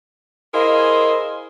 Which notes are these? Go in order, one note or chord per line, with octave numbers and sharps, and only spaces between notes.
E4 G#4 A#4 C5 D#5 F5